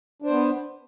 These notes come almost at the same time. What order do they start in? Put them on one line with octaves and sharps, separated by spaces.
D4 C5 B3